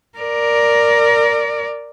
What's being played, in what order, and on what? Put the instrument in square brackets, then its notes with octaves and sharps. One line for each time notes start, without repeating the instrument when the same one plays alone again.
[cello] A#4 D5